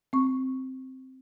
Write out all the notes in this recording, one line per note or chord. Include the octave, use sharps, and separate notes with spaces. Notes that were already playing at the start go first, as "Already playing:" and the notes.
C4 C#6